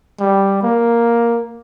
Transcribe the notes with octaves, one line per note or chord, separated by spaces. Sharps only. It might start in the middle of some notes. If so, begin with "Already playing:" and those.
G3
A#3